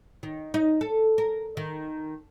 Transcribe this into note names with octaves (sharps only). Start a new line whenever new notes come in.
D#3
D#4
A4
A#4
D#3